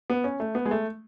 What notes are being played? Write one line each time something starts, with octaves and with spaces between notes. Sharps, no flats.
B3
C#4
A3
B3
G#3
A3